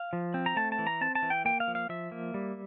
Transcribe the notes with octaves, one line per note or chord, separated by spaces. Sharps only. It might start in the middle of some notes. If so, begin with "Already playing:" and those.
Already playing: F5
F3
C4
A#5
A3 A5
A5
E3
A#5
C4 A5
A5
E3
G5
A#3 G5
F5
F3
F5
F3 E5
A#3
G3